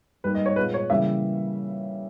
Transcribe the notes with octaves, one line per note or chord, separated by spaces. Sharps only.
G#2 G3 A#3 B4
D#5
C#5
A#2 G#3 B3 B4
C#5
C#3 E3 G3 A#3 E5